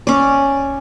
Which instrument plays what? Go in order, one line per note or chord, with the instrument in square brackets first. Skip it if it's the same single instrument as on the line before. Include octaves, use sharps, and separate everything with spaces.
[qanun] C#4 D5